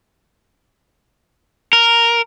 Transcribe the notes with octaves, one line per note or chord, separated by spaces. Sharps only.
A#4